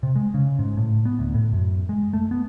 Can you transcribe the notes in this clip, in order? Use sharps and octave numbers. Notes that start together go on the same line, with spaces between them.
C3
G#3
C#3
G#2
A2
B3
D2
A2
F#2
G#3
A3
B3